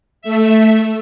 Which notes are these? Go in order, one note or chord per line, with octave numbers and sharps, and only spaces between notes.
A3 E5